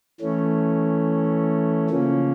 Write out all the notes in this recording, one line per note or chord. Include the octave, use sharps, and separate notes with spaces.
E3 A3 C#4
C#3 F3 A#3 C#4